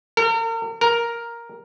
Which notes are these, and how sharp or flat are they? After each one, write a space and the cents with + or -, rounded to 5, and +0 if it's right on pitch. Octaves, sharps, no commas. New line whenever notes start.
A#4 -40
A#4 +5